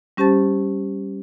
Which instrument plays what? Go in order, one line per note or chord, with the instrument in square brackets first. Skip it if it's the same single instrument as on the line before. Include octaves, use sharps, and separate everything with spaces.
[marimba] G3 C#4 G4 C5 A5 A6